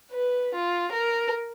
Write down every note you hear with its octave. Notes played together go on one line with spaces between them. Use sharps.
B4
F4
A#4